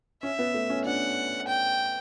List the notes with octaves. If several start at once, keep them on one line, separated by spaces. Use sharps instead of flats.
C#4 E5
B3
A3
C#4
D4 F#5
G5